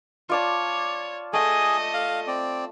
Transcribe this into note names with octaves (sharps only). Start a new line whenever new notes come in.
F4 C#5 D5 A5
A3 G#4 A4 D#5 G5 G#5
F5
C4 D5